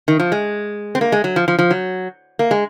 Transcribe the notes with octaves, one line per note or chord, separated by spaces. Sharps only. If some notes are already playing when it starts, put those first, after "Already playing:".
D#3
F3
G#3
C4
A#3
G#3
F#3
F3
F3
F3
F#3
A#3
G#3